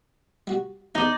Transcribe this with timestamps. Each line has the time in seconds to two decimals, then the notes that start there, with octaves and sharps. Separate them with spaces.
0.47 G3 F#4
0.95 E2 D#4 G#4 D5